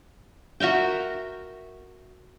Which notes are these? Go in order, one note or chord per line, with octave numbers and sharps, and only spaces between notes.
F#4 A#4 E5 G5